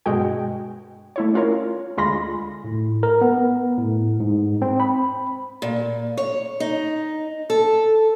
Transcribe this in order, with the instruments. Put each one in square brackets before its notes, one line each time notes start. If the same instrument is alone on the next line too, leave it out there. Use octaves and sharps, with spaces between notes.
[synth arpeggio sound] G2 B2 G#3 F#4 G5
A3 E4 C#5
C#4 F4 A#4 C#5
D2 G#3 F4 B5 C6 A#6
[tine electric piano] A2
A#4
B3
A2
G#2
C4
B5
[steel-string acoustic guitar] A#2
C#5
D#4
A4